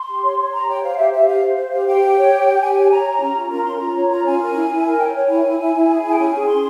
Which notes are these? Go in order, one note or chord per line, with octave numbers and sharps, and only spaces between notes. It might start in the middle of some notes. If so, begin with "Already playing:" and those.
Already playing: C6
G4
C#5
C#5
G4 A#5
C#5 G5
C5 F5
G4 E5
G4 E5
C5 F5
C5
C5
G4 F5
G4 G5
G4
C#5
G4
G4
G4 G#5
C#5
C#5 A#5
G4
C#4
F4
A#4 A#5
C#4 C6
F4 A#5
C#5
F4 A#5
C#4 G#5
A#4
E4
E4
A#4
C#5 G5
C#5
E4 G#5
E4
E4
E4
G#4
E4 G5
C#4 G#5
G#4
C#4 C6